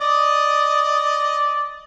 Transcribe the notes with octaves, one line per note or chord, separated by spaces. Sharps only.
D5 D#5 D#6